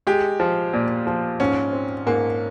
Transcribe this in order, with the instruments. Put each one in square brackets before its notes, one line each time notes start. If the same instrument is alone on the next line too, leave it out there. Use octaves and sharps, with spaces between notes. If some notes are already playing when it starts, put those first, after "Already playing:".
[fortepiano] G#3 [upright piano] G4
[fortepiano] F3
A#2
F3
[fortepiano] G#2 [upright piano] C#4
[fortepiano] C4
[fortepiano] G#2 [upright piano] A#3